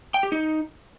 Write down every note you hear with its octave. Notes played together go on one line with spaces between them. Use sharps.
G5
G4
D#4